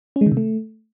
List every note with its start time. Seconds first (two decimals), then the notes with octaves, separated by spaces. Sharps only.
0.16 C#4
0.21 G#3
0.26 D#3
0.32 C3
0.37 A3